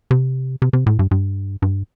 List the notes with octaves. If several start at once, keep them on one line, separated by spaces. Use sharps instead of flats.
C3
C3
C3
A2
G2
G2
G2